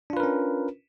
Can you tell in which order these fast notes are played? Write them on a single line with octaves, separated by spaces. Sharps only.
D4 F4 B4 A#4 C#4